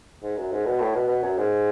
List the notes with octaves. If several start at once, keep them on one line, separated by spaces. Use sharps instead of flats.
G#2
F#2
G#2
B2
A2
B2
B2
F#2
G#2